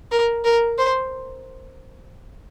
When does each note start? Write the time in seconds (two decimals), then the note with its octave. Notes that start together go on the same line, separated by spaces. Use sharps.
0.12 A#4
0.44 A#4
0.78 C5